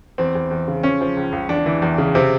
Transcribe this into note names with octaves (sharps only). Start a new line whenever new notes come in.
E2 C4
E2
E2
C#3
F3 C#4
F3
C#2
C#2
E2 D4
E3
E2
C#3
C3 C4